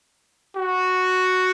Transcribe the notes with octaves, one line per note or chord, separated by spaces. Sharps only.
F#4